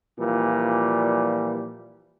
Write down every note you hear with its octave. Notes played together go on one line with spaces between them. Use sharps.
A#2 E3 F3 G3